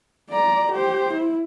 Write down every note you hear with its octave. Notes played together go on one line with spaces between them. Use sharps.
D5 A#5
G4 C5
E4